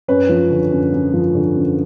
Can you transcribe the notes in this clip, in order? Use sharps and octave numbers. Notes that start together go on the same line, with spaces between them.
F#2 B4 C#5
F3
D3
F#2
F#2
F3
D3
F#2